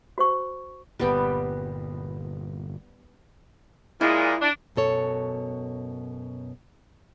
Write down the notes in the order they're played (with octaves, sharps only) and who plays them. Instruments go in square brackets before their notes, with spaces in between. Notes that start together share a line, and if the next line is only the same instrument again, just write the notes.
[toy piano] F#4 C5 C#6
[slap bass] G1 A#2 [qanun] G3 B3 G5
[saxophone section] A#2 G#3 [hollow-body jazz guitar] E4
[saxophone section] D4
[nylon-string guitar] F#2 B2 A4 C#5